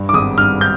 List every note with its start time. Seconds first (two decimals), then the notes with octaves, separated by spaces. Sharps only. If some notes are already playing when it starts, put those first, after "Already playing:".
Already playing: G2
0.09 D6
0.13 G#1 D#6
0.38 G2 F6
0.61 G6